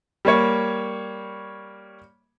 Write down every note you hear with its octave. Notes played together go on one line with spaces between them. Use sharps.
G3 A#3 C#5